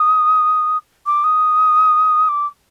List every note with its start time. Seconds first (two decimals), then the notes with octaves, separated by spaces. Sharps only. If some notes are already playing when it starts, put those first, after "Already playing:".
Already playing: D#6
1.06 D6
1.24 D#6
2.28 D6